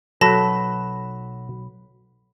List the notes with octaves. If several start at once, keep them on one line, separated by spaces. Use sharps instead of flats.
B1 F#3 A4 B4 A5 A#6